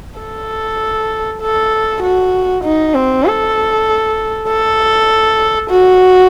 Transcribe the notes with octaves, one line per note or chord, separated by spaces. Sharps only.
A4
A4
F#4
D#4
C4
A4
A4
F#4